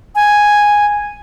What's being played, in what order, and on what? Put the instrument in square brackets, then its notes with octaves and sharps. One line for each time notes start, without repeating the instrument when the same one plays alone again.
[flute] G#5